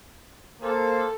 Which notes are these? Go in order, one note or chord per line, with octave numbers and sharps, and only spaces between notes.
A#3 A4 C5